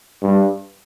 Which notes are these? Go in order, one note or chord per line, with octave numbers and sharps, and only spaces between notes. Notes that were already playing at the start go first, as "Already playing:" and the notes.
G2